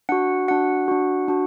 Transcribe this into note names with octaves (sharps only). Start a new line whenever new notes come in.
D4 F#4 F#5
D4 F#4 F#5
D4 F#4
D4 F#4